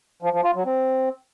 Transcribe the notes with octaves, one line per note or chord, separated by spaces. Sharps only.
F3
F3
F4
F#3
C4